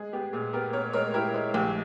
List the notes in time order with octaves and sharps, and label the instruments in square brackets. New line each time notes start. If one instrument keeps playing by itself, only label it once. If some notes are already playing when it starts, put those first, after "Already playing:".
Already playing: [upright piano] G#3 G#4
B3 G4
A#2 G#4
B3 G4 A#4
B3 A#4 C#5
G#3 A#4 C#5
E4 G4 A#4
G#3
A#1 G4